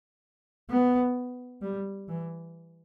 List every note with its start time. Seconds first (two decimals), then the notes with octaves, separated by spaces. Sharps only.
0.70 B3
1.62 G3
2.08 E3